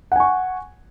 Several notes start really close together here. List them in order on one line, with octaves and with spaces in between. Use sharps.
F#5 G#5 C#6